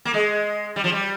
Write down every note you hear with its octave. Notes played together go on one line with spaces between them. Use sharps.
A#3
G#3
G3
F3
G3